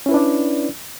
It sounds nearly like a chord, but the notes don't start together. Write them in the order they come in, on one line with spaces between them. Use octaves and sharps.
C#4 E4 B4 D4 D5